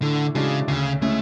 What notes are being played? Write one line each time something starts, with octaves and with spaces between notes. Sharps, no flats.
A2 D3
C#3 E3 G#3 D4 F#4
D2 C#3
C#3 G#3 A3 C#4 E4